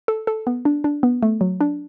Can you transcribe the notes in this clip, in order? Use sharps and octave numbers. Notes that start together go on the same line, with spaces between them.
A4
A4
B3
D4
D4
B3
A3
F#3
D4